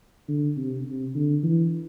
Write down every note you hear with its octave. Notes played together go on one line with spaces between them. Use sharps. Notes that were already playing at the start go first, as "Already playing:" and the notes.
D3
C3
C3
D3
E3